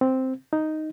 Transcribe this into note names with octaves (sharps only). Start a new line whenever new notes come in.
C4
D#4